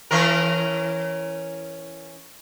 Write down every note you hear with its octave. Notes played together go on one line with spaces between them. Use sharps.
E3 C#4 A#4